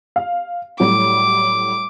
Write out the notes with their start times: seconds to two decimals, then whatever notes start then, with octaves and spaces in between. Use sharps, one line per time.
0.16 F5
0.80 A2 F#3 G3 D6